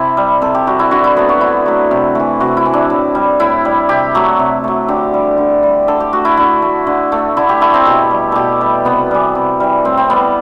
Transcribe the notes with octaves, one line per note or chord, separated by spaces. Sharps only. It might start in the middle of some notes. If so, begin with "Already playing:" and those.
Already playing: C3 E4
G3
C3 A4
G4
G3 F#4
E4
D3 F#4
E4
F#3 A3 B3
F#4
D3 E4
F#3 A3
C3
E3 A3
C3 F#4
E4
E3 A3
D4
A2
G3
A2 E4
G3
C3 G4
F#3 A3
C3
F#3 A3
D3 G4
G3
D3
G3
D3 A4
G4
A3 F#4
E4
D3 E4
A3
D3
A3
D3 E4
G4
A3 E4
C4
B2 G4
G3
B2 G4 A4
G3
C3 B3
E3 G3
C3
E3 G3
A2 C4
C4
G3 B3